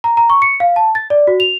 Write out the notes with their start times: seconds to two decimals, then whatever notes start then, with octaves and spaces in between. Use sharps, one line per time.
0.04 A#5
0.17 A#5
0.30 C#6
0.42 C#7
0.60 F5
0.76 A5
0.95 A6
1.10 D5
1.27 F#4
1.40 F7